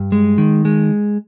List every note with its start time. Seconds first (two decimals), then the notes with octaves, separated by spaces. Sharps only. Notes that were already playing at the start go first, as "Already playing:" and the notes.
Already playing: G2
0.12 G#3
0.38 D#3
0.65 G#3